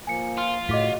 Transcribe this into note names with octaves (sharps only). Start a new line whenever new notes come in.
F3 A#3 G#5 C#7
F4
A2 C#3 F#4 D#5 D6 B6